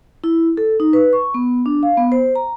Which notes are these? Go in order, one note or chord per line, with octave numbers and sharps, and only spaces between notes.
E4
A4
D#4
B4
C#6
B3
D4
F5
B3
C5
A#5